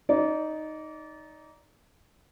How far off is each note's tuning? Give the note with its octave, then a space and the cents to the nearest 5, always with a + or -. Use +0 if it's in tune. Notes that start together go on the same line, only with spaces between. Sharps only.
D#4 +0 D5 -25